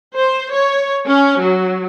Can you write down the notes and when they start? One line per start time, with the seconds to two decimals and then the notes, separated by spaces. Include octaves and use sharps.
0.16 C5
0.54 C#5
1.06 C#4
1.42 F#3